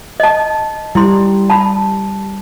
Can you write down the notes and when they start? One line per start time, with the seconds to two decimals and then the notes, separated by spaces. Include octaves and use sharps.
0.20 D#5 A5
0.95 G3 E4 C6
1.50 A5 B5